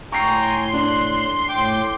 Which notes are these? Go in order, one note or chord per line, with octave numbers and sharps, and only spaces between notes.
A2 G5 G#5 A#5 C6 C#6 C7
D4 F#6
A2 G5 D6